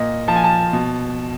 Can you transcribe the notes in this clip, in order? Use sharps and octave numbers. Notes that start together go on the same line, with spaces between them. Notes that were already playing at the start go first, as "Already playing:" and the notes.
Already playing: A#2 D#5
F3 A5
G#5
A5
B2